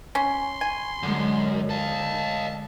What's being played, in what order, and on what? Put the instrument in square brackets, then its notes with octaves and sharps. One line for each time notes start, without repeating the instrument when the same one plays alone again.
[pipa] C#4 [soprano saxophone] C6
[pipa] G#5
[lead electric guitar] F#2 [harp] D3 G#3
[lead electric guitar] D#5 F5 [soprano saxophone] A5